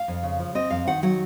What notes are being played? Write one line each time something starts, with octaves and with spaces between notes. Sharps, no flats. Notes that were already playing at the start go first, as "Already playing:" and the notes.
Already playing: F5
F2
C#3
F3
C4 D#5
F2 F5
D#3 F#5
F#3 F#5